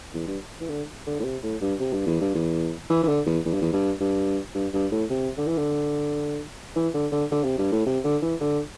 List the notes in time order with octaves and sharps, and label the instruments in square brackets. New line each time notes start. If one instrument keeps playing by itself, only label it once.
[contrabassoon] E2
G2
E3
D3
D3
A2
C3
A2
G2
C3
G2
E2
G2
E2
E3
E3
D3
E2
E2
G2
E2
G2
G2
G2
G2
A2
C3
D3
E3
D3
E3
D3
D3
D3
C3
G2
A2
C3
D3
E3
D3